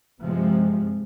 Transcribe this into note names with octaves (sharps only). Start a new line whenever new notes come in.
G2 C3 F3 G#3